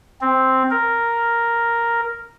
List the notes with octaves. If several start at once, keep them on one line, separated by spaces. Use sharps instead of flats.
C4
A#4